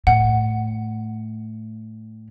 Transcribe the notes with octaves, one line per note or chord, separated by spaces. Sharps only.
A2 F#5